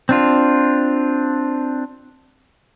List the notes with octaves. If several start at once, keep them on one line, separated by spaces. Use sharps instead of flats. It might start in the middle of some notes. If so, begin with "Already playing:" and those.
C4 D4 F4